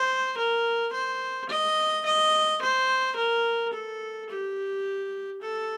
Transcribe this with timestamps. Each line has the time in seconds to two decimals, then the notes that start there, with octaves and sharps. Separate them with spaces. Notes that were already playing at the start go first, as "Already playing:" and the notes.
Already playing: C5
0.37 A#4
0.93 C5
1.49 D#5
2.06 D#5
2.62 C5
3.17 A#4
3.73 A4
4.30 G4
5.41 A4